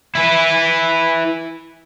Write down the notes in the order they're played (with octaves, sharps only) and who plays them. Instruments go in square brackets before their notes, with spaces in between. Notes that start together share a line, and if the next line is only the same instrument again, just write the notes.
[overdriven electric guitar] E4 B4